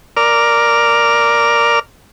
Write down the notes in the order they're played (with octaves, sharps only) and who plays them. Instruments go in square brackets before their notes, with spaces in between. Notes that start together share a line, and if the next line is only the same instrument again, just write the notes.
[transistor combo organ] A#4 D5 F6